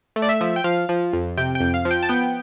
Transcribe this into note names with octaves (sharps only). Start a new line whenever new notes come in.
A3
D5
E5
F3
G5
F3 F5
F3
F2
C3 G5
G5
F2
F5
F3
G5
A5
B3 G5